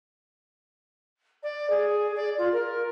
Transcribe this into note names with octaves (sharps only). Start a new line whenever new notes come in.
D5
G#4
D5
F4
A#4